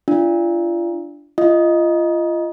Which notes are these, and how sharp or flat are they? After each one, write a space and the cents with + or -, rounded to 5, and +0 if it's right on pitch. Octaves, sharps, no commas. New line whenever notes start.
D4 +0 F4 -35
F4 -25 D#5 +0